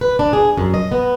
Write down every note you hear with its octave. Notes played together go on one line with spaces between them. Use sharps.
B4
D4
G#4
F#2
D#5
B3